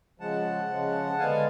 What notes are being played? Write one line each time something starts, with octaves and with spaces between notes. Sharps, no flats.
C#3 F3 G#3 F#5 A5
C#3 F3 G#3
D3 G#3 B3 F5 G#5